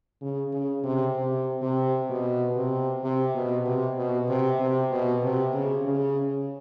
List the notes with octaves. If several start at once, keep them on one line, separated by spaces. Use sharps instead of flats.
C#3
C#3
C3
C3
C3
B2
C3
C3
B2
C3
B2
C3
C3
B2
C3
C#3
C#3